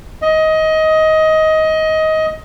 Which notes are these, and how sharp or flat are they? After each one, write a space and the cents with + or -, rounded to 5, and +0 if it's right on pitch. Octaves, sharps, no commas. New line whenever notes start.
D#5 +20